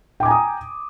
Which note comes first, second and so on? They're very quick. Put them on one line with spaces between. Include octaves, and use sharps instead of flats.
G5 D6 G#5 A#5 D#6